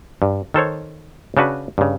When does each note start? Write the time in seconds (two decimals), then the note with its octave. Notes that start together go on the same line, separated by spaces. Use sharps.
0.22 G2
0.54 D#3 A4 C5 C#5
1.37 C#3 D4 F#4 B4
1.78 G2 C#3